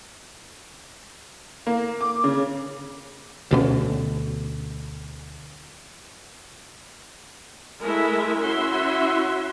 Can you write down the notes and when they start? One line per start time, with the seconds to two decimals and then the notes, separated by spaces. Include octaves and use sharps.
1.67 A#3
2.01 D6
2.24 C#3
3.51 D2 B2 A#3 C#4
7.82 G#3 A3 E4 A#4 E5
8.39 C#4 E4 F#4 E5 C6